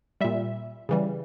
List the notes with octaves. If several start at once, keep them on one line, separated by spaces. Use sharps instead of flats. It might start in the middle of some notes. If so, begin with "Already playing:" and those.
A#2 G3 E5
C#3 E3 G3